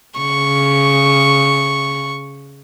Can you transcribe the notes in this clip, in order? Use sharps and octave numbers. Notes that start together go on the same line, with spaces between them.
C#3 C#6